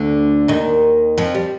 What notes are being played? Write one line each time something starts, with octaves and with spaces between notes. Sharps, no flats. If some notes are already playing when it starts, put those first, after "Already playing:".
Already playing: D2 D3
D#2 D#3
F2 F3
G3